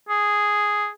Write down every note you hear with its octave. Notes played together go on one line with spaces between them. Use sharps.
G#4